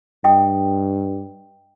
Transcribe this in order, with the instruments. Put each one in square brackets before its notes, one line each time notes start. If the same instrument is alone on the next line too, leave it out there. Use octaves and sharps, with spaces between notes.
[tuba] G2 [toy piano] D#5 G5 D#6